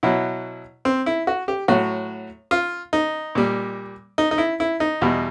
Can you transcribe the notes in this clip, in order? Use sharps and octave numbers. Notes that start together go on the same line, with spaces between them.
B2 F#3 E4
C4
E4
F#4
G4
A2 F#3 F#4
F4
D#4
A#2 G3
D#4
D#4
E4
E4
D#4
E2 B2 G3